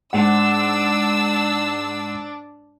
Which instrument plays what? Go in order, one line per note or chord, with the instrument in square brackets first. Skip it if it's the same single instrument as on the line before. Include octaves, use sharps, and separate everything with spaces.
[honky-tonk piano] G#2 F#5 [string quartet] D4 [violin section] E6